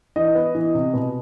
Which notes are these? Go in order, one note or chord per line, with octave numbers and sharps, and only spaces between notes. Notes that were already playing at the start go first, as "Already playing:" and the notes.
E3 D#5
B3
E3
C3
B2